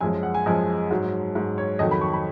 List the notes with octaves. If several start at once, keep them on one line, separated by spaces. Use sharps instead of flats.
F#2 F3 G#3 G#5
F#5
G#5
F#2 F3 G#3 D#5
G#2 F#3
G#2 F#3
C#5
F2 D#3 F#3 D#5
B5
C#6
B5